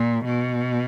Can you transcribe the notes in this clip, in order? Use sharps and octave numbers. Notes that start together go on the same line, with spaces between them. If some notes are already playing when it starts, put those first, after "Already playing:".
Already playing: A#2
B2